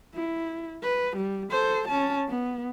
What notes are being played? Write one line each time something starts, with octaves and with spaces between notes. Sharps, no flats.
E4
B4
G3
A4 C5
C#4 A5
B3